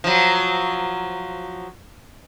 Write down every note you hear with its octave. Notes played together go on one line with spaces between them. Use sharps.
F3 F#3